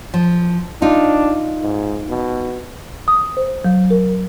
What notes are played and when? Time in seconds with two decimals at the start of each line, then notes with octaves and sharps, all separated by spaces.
0.14 F3
0.82 D4 D#4 F4
1.62 G#2
2.08 B2
3.08 D#6
3.37 C5
3.65 F#3
3.90 A#4